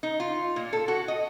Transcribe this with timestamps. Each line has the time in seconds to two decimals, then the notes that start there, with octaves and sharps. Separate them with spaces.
0.03 D#4
0.20 F4
0.56 A#2
0.73 A4
0.88 F#4
1.08 D#5